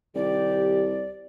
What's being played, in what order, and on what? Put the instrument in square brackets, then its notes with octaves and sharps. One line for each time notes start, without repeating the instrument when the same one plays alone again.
[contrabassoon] C2 [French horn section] D#3 G4 [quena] D5